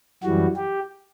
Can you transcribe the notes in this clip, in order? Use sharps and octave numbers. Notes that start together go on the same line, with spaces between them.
F#2 E3 G3 F#4
G4